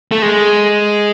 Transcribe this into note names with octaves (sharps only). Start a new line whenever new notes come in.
A3
G#3